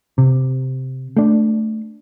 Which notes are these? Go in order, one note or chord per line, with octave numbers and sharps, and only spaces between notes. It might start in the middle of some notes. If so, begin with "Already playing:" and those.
C3
A3 D4